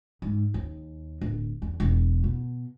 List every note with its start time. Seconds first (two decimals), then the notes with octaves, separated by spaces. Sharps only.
0.22 G#2
0.54 D#2
1.21 D1
1.62 E2
1.80 E1
2.24 B2